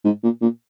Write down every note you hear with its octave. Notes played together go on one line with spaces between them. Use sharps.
G#2
A#2
A#2